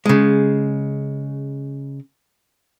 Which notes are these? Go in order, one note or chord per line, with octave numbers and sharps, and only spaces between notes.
C#3 G#3